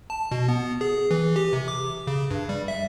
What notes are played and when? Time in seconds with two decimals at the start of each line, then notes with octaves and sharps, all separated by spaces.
0.10 A5
0.31 B2
0.48 B3
0.81 G#4
1.11 E3
1.36 G4
1.53 C3
1.68 D6
2.07 C#3
2.31 G2
2.49 G3
2.68 E5